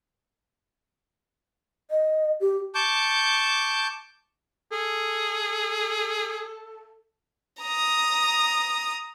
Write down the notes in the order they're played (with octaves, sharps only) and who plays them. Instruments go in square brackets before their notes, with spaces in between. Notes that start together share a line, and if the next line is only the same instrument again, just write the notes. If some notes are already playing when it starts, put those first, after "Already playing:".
[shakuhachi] D#5
G4
[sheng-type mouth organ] A5 C#6 D6 G6
[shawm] G#4 [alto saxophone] A4
[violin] A#5 D#6